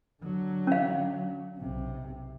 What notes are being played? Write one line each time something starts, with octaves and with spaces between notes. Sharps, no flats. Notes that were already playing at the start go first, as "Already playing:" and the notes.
D3 F#3
C#4 F5
B1 C3